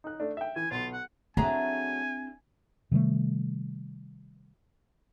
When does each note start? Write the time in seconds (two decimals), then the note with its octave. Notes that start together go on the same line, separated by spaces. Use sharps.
0.04 D#4 F#6
0.20 A3 D4
0.37 E5 G5
0.56 E3 G#5
0.71 B1 F4
0.93 F#5
1.37 F#3 A3 C4 D4 E4 G#4 G#5 A#5
2.92 C3 D#3 G3 A3